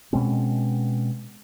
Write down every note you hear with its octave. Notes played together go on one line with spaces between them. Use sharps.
B2 G#3 C4 C#4